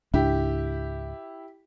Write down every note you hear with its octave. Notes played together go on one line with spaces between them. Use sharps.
C#2 G#2 D4 E4 G4